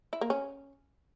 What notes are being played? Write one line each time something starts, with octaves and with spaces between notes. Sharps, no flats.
E4
A#3
C#4